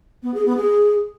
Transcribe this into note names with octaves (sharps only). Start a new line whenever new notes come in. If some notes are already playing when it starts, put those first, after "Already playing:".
B3
G#4
B3
G#4